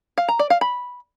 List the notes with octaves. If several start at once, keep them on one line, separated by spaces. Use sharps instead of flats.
F5
A#5
D5
F5
B5